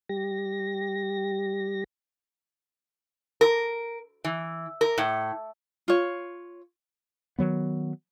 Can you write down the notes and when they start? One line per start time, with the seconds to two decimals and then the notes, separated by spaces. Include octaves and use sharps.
0.09 G3 G4 A#6
3.41 A#4
4.24 E3
4.81 A#4
4.98 A2
5.88 F4 C#5
7.39 D#3 F#3 B3